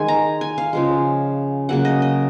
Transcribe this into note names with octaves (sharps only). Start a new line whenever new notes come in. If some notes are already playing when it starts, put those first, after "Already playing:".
Already playing: D#3 G#3 G#5
A#5
G#5
F5
C#3 F3 G#3
C#3 F#3 A#3 F#5
D#5
D#5